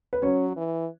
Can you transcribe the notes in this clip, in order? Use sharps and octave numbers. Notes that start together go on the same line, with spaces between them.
B4
F#3 C#4 C#5
E3